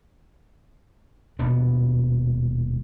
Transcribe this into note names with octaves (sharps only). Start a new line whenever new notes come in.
D#1 B2 B3 D4